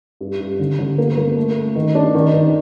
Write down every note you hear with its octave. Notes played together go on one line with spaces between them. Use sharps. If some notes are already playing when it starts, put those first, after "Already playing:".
G2
G2
D3
D3
A#3
A#3
A3
A3
D#3
D4
D#3
D#3